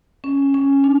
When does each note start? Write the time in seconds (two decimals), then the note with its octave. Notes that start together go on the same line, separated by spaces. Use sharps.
0.24 C#4
0.54 C#4
0.84 D4